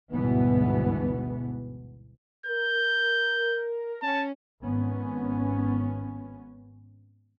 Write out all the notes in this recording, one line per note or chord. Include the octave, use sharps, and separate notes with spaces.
G1 D2 G#2 B2 E3 B3
A#4 G6
C#4 A5
G#1 B3 C#4